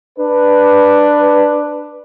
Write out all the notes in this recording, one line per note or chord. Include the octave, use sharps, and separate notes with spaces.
D4 B4